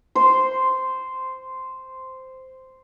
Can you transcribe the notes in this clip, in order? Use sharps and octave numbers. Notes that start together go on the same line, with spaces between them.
C5 C6